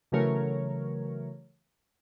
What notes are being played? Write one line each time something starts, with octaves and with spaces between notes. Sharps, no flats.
C#3 E3 F#3 A3 A#4 C#5